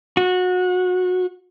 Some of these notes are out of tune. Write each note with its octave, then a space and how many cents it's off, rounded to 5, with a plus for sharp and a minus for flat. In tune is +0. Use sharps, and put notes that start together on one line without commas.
F#4 -25